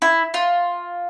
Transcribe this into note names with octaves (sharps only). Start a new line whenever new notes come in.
E4
F4